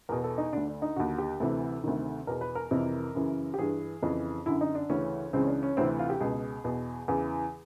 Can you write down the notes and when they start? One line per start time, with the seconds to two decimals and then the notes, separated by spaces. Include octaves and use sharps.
0.09 E2 B2 A#4
0.24 A4
0.38 D#4
0.53 D2 D3 D4
0.67 D4
0.82 D#4
0.96 D#2 D3 F#4
1.18 G4
1.40 D2 C3 E3 A4
1.84 D2 C3 D#3
2.27 E2 B2 A#4
2.41 B4
2.55 A#4
2.71 F2 C3 E3
3.15 F#2 C#3 E3
3.54 G4
3.59 G2 E3 G#4
4.03 F2 C#3 E3
4.46 F#2 D3 E4
4.61 D#4
4.75 D4
4.89 D2 C#3 E3 C#4
5.33 C#2 C#3 E3 C4
5.42 C#4
5.47 D4
5.63 C#4
5.77 D2 C3 E3 C4
5.99 F4
6.10 G4
6.20 C#2 B2 G#4
6.64 E2 B2
7.08 E2 C#3 E3